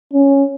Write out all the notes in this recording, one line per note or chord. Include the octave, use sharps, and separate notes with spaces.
C#4